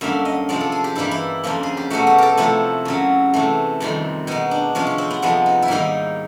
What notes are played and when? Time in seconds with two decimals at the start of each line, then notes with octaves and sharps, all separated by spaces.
0.01 F#2 D3 G3 A#3 E5
0.25 D#5
0.49 C3 F3 G#3 D5
0.61 A4
0.72 G#4
0.84 G4
0.95 G2 E3 G3 A#3 E4
1.11 E4
1.43 F2 C#3 F3 A#3
1.63 G#4
1.77 G4
1.90 B2 F#3 A3 F#4
2.07 G4
2.18 A4 A#4
2.38 C3 F3 A3 E4
2.85 F#2 C#3 F#3
3.34 C3 E3 A3
3.80 F2 C3 D#3 G3
4.27 B2 G#3 D#4
4.51 D4
4.75 C3 F3 G#3 C#4
4.87 C#4
4.98 C4
5.11 B3
5.22 F2 C3 F3 G#3 B3
5.46 D#4
5.62 E4
5.68 G#2 D#3 G3 A#3 D#4